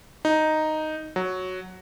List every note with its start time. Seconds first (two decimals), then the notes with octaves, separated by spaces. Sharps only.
0.25 D#4
1.16 F#3